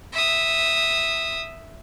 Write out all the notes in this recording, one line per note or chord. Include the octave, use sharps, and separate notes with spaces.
E5 D#6